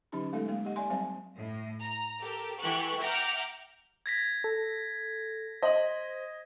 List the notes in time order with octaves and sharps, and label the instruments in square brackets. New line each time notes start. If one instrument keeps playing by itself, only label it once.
[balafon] D3 F#3 C#4 D#4 G4 B5
G#3 A3 B3 D#4 A4 E5
G#3 A#3 F5
G4 D#5 F#5
D5 E5 G#5 C6
F#3 G3 C4 C5 E5 G#5
[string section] A2
A#5
G4 A4 A#4
E3 G4 A4 F#5 C#6 F#6
E5 F#5 G5 A#5 D6 F6
[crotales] G#6 A#6 B6
[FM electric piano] A4
[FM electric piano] C5 [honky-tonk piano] D#5 F#7